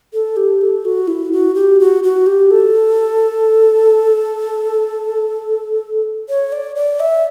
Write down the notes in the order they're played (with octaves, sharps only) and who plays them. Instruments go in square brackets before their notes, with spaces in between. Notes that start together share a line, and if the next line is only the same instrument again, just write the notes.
[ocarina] A4
G4
A4
F#4
E4
F#4
G4
F#4
F#4
G4
A4
C#5
D5
D5
E5